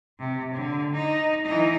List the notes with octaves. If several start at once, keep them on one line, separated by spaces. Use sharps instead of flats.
C3
D3
D#4
E3 D#4